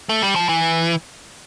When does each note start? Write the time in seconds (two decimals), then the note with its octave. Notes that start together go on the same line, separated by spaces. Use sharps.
0.09 A3
0.23 G3
0.36 F3
0.49 E3